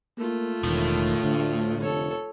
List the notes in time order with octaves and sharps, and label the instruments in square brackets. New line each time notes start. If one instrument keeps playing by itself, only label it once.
[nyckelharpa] A3 F4 [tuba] A#3
[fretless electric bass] E1 [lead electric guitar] A2 [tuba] D#3
[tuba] D2 [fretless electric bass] D3
[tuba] F1 [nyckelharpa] A4 C#5